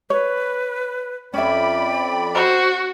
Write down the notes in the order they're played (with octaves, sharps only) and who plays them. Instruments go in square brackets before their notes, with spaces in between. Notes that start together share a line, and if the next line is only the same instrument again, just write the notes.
[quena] B4 [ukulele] C#5
[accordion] F2 D5 B5 [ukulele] C#4 E5 [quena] G5
[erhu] F#4 [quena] C5